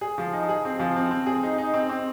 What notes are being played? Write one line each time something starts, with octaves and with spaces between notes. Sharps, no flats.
G#4
F3
D#4
G#4
C4
F3
C4
C4
G#4
D#4
D#4
C4
C4